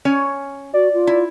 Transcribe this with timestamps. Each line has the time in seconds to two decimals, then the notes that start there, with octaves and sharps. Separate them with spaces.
0.05 C#4 C#5 G#5
0.74 F#4 D5
0.93 F4
1.07 E4